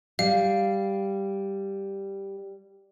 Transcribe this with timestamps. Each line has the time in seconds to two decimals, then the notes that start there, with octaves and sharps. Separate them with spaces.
0.19 G3 F5